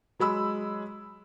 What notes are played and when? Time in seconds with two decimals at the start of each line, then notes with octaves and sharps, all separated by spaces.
0.19 F#3 G#3 B5 E6